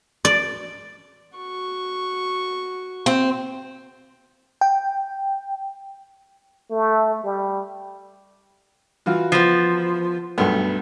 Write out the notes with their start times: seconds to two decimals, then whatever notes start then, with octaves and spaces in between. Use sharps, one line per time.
0.25 D5
1.37 F#4 C#6
3.06 C4
4.61 G5
6.71 A3
7.24 G3
9.06 E3 F4 F#4
9.32 F3 B3
10.38 B1 G2 A3 B3